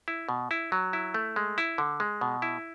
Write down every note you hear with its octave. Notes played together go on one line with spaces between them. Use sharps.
E4
B2
E4
F#3
E4
A3
G#3
E4
D3
G#3
B2
E4